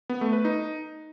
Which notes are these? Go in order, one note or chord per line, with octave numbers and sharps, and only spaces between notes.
B3
A3
B4
D#4